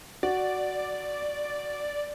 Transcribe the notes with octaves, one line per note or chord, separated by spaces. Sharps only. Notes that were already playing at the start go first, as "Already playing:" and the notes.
F#4 D5